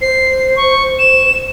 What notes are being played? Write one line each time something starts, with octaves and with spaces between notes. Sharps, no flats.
C5 C7
C#6
E7